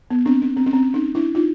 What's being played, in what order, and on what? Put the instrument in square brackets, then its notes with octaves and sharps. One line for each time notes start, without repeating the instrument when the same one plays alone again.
[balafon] B3
C4 D4
C#4
C4
C#4
C4
C#4 D#4
D4 E4
D#4 F4